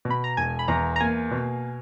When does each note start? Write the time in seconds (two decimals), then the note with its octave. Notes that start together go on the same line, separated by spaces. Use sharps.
0.05 B2
0.10 B5
0.24 A#5
0.37 E1 G#5
0.59 B5
0.68 E2 A#5
0.96 A#5
1.00 A#3 G#5
1.31 B2